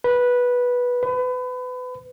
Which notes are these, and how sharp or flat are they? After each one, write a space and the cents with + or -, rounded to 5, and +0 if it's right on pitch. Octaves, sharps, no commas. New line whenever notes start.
B4 -10
B4 +30